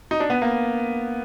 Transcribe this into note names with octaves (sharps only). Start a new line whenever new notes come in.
D#4
D4
B3
A#3